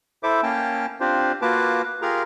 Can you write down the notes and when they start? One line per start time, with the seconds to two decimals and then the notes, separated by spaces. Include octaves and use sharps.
0.23 E4 A4 C5 E5 D6
0.43 A#3 C#4 G5 A5
1.00 C4 D4 F4 G4 C5
1.42 A#3 F4 F#4 B4 A5 D6
2.02 F4 G4 G#4 A#4 A#5